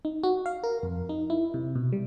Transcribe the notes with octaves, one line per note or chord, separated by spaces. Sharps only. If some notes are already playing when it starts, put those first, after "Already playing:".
D#4
F#4
F5
A#4
F2
D#4
E4
C3
B2
G3